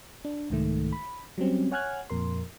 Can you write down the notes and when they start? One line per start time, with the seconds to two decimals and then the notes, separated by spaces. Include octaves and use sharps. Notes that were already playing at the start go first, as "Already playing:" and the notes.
0.25 D4
0.50 C2 G#2 D#3 A3
0.93 B5
1.38 F#3 G3 C4 C#4
1.71 C#5 F#5 G#5 F6 F#6 G#6
2.10 F2 A#2 A#4 C6